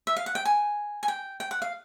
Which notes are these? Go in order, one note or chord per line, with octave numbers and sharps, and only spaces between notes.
E5
F5
F#5
G5
G#5
G#5
G5
G5
F#5
F5